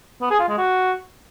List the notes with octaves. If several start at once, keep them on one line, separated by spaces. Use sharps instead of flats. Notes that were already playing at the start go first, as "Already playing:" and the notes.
B3
G#4
F4
G#3
F#4